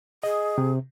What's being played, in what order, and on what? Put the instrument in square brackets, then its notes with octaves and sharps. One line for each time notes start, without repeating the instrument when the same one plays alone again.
[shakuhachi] G#4 [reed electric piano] D#5
[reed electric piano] C3